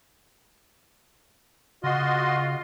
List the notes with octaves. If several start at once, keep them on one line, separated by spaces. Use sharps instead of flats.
C#3 F4 F#4 D#5 C6